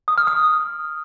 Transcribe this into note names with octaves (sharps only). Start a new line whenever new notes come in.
D#6
F6
D#6